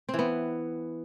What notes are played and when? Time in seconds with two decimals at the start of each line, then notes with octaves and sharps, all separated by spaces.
0.09 C4
0.14 E3
0.19 B3